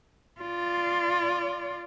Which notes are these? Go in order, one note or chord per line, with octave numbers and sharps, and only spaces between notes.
F4 D5